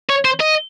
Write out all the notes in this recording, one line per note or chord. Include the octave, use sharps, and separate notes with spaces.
C#5
C5
D#5